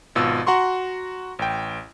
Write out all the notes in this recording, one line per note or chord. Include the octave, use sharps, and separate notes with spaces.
G#1 B2 F4 E6
F#4 F#5 A#5 C6 C#6
A1 G5